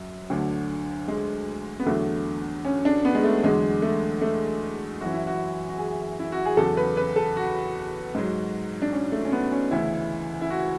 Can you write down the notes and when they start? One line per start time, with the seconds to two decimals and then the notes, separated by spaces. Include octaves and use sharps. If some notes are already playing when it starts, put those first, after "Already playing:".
Already playing: F#2 F#3
0.30 D2 D3 F#3
1.08 G#3
1.80 B3
1.86 E2 D3 F#3 A3
2.65 C#4
2.85 D4
3.05 B3
3.15 G#3
3.23 A3
3.44 E2 D3 F#3 G#3
3.82 A3
4.21 A3
5.01 F#2 E3 F#4
5.13 E4
5.27 F#4
5.69 F#4
5.79 G#4
6.19 E4
6.32 F#4
6.45 G#4
6.57 E2 C#3 F#3 A4
6.77 B4
6.97 B4
7.16 A4
7.36 F#4
8.15 G#2 F#3
8.82 D4
8.93 C#4
9.12 A3
9.25 C#4
9.32 B3
9.52 C#4
9.71 D2 C#3 E3 E4
10.41 E4
10.50 F#4